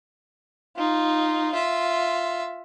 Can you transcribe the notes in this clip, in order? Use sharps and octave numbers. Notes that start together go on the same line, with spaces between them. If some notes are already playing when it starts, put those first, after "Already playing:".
D#4 F4
F4 E5